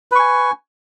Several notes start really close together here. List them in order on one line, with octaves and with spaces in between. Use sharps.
B4 C#6 G#5